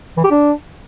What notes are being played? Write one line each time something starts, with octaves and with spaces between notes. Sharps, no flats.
E3
G4
D4